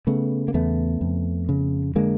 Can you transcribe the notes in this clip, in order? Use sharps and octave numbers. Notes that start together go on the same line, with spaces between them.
C#3 A3 B3
A#3
E2 A3 B3
F2
C#3
D3 G#3 A#3